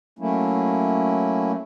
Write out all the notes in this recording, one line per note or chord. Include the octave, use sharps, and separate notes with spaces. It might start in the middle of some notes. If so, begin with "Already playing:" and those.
F#3 A3 A#3 C#4 E4